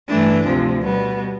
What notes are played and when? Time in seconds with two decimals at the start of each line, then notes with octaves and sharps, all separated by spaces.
0.08 G2 E3 A3 D4
0.45 D2 C3 F3
0.83 B2 G3 B3